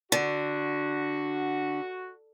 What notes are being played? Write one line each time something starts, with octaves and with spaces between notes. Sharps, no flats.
D3 F#4